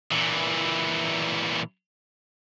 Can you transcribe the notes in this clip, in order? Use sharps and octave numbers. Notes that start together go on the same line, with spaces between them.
A#2 E3